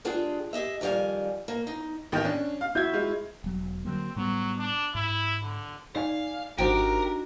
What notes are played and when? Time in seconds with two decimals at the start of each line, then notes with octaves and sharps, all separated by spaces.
0.05 G#3 D4 F4 G4 G#4 G5
0.53 G4 G#4 D#5 E5
0.81 F2 D#3 G3 F5 G#5
1.48 A#3
1.67 D#4
2.12 A1 D#3 G5
2.25 C#4 D4
2.61 F5
2.75 E4 F#4 E5 G6 G#6
2.94 G#3 F4
3.44 E1 F#3
3.85 D3 F#3 A#3 C4
4.16 A2 F#3 G3 B3
4.58 D4
4.95 G#2 E4
5.43 D3
5.96 D#4 D5 F5 G#5
6.58 G#1 D4 D#4 F#4 G4 A#4 C5